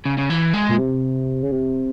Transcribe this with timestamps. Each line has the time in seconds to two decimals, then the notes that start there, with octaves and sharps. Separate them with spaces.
0.06 C#3
0.18 C#3
0.30 E3
0.54 G#3
0.69 A#2
0.78 C3
1.43 C#3
1.52 C3